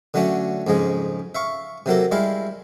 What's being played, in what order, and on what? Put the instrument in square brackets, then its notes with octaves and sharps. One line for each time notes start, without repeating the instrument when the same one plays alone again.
[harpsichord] D3 F#3 A3 C#4 D4
F2 G#2 C#3 G#3
E5 F5 C#6
C3 F#3 A#3 A4
G3 G#3 E4 F5